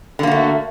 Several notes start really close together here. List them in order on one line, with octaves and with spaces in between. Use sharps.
D3 A#3 F#4 A3